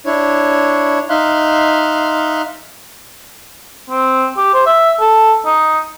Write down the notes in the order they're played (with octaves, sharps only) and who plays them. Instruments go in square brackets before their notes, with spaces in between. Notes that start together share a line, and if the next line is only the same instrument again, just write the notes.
[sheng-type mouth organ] D4 E4 C#5
D#4 E5 F5 C6 F#6
[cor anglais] C4
G4
C5
E5
A4
D#4